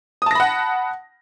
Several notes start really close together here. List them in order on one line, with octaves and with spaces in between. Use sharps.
D#6 A5 A#6 B5 F#5